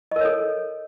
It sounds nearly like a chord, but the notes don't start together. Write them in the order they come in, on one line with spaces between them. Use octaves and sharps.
D#5 A#4 C#5 A4